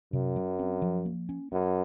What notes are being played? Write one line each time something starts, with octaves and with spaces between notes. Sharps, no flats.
F#2 C3
F#3
C4
F3
A#3
C#4
F#2 C#4